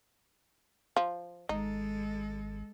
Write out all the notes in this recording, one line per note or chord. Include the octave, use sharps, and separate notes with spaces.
F3
G#1 G#3 D#4 A4